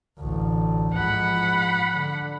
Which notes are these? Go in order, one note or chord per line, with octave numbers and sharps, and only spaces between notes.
A1 D2
G#2 F3 F#5 B5
D3